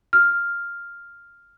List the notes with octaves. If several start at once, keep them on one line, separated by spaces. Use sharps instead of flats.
F6